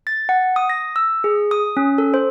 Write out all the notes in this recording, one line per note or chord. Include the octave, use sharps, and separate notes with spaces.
A6
F#5
D#6
A#6
E6
G#4
D#6
C#4
A4
C5